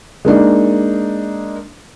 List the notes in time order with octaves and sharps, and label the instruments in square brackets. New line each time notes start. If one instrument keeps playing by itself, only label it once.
[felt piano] G#3 A#3 D4 D#4